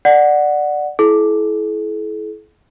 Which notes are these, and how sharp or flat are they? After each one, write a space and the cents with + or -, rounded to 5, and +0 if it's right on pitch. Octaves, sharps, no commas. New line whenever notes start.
D5 +10 F#5 +0
E4 +0 A4 -45